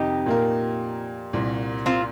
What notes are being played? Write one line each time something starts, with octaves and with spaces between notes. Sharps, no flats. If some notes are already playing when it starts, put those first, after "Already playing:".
Already playing: F2 C3 D#3 C4 D#4 G4
A#2 A#3 F4 A#4
C2 A#2 A#3
C4 F4